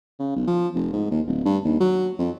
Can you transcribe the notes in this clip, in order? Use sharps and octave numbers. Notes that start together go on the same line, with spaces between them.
C#3
B1
F3
F1
G#2
D#2
D1
G2
D#2
F#3
F2